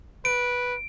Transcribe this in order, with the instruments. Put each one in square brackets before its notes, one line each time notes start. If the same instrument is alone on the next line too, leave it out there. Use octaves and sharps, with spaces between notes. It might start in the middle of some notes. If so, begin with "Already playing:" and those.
[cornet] B4 [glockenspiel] D7